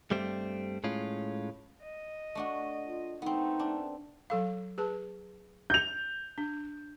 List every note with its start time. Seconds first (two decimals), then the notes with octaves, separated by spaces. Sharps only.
0.11 G2 G3 A3 C4
0.84 A2 G#3 C#4 F4
1.83 D#5
2.35 A3 D4 F#4
2.85 F4
3.22 A3 B3 C4 D#4
3.59 D4
4.30 F#3 A4 F5
4.78 G#4 B4 A5
5.70 G6 F7
6.38 D4